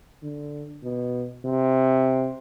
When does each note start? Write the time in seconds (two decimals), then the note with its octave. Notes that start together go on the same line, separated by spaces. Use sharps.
0.23 D3
0.84 B2
1.45 C3